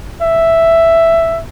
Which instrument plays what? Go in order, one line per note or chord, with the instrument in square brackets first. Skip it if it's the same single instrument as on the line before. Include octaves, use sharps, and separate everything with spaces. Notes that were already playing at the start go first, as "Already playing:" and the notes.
[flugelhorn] E5